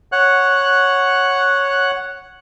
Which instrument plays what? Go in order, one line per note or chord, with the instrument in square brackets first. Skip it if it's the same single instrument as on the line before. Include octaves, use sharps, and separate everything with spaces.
[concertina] C#5 F#5 F#6